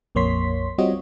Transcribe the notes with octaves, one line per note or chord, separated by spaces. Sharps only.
A#1 F2 A#3 C#5 C6 B6
G3 C4 F4 F#4 C#5 D#5